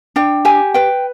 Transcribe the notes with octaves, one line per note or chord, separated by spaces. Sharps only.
D4 G5
G4 G#5
B4 G5